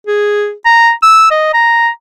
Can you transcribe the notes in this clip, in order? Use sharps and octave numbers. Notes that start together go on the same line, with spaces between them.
G#4
A#5
E6
D#5
A#5